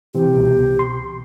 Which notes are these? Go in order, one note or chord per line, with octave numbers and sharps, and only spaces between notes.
C3 E3 C4 G4
C2 B2
C6